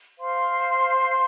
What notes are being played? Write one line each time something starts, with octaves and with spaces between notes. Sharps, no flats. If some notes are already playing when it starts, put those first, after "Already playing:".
C5 F5 C6